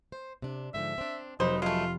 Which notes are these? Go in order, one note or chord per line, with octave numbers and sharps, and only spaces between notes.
C5
C3 D4
G#2 D3 F3 E5
C4 D4
F1 F#3 D#4 C5 B5
G#3 A3 F4